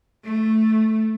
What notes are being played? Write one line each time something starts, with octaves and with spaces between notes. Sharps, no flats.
A3